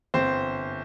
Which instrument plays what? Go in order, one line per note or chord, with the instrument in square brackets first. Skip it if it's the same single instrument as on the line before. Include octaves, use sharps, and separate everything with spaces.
[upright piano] G1 C4 C5